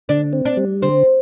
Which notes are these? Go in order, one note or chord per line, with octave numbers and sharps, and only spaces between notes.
D3 D4
C4
D4
G3
D3 C4